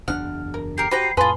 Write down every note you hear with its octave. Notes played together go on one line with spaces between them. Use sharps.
F#1 E2 D4 F#5 F6
A#4
G4 A#4 C7
F#4 G4 B4 C5 G5 A#5
F2 A2 F4 G#4 B4 A5 B5 C6